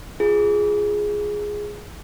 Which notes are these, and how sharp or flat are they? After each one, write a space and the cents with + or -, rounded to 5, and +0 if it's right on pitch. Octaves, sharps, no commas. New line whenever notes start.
F4 +0 G#4 +0